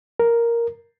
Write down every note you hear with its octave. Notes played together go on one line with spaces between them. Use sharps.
A#4